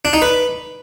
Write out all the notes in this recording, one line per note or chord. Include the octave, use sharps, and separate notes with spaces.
D4
D#4
B4